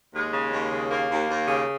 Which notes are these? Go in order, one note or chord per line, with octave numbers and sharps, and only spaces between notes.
D#2 G#3
C#3
D#2
C#3
D#2 A#3
D#2
D#2
C#3